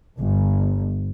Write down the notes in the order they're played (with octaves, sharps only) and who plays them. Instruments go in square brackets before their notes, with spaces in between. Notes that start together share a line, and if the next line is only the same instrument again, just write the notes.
[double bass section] G1